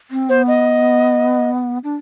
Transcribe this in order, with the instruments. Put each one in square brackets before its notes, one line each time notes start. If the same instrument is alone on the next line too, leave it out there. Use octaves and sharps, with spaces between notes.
[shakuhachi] C4
[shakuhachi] B3 [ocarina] C5
[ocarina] D#5
[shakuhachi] D4